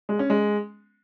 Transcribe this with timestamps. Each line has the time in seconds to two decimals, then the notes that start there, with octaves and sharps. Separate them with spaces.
0.09 G#3
0.19 C#4
0.30 G#3